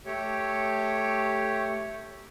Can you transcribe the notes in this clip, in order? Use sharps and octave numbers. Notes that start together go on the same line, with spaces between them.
A3 G4 C#5